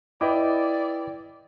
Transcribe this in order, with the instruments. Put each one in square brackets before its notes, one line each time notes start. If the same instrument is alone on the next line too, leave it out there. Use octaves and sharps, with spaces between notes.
[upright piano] E4 D#5 [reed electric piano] B4 G5 D6 [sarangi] D5